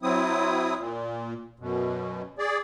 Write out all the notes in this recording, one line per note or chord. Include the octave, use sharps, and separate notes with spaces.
F#3 C4 E4 D#6
A#2
F#2 B2
G#4 D5